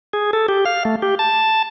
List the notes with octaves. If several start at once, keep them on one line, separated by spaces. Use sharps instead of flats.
G#4
A4
G4
F5
A3
G4
A5